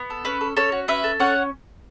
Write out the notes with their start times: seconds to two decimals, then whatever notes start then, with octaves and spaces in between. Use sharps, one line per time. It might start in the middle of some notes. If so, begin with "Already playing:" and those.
Already playing: B3
0.10 A4
0.25 C#4 B4
0.41 A4
0.57 C#4 A4 C#5
0.72 F#4
0.88 C#4 B4 E5
1.04 A4
1.20 C#4 C#5 F#5